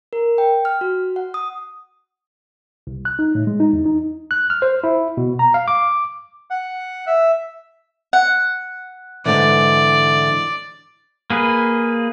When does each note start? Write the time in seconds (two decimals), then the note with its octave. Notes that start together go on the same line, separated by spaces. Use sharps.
0.13 A#4
0.38 G5
0.65 F6
0.81 F#4
1.16 F#5
1.34 D#6
2.87 C2
3.05 F#6
3.19 D#4
3.35 A2
3.47 G#3
3.60 D#4
3.73 E2
3.86 D#4
4.31 F#6
4.50 F6
4.62 C5
4.84 E4
5.17 B2
5.39 A#5
5.54 F5
5.68 D6
6.50 F#5
7.07 E5
8.13 F#5
9.26 G#2 D3 E3 D5
11.30 A#3 G#4 B4